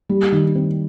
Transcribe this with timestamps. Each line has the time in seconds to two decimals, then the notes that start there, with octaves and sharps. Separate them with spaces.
0.09 G3
0.32 D#3
0.55 C4